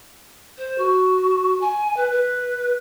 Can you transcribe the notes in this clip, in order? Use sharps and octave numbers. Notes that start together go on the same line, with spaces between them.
C5
F#4
G#5
B4
B4